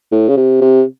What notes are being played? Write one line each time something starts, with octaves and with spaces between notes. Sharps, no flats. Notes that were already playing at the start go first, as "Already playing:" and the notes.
A2
C#3
C3
C3